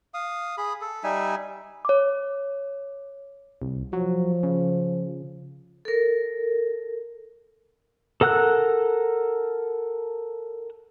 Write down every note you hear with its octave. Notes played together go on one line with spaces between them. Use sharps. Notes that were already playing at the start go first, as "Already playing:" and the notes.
F5 D#6
G#4 B5
A4
G3 D#4 E5 G#5
C#5 D6
C2
F3 F#3
C#3
A4 A#4
A4 A#4 F#5 E6 F#6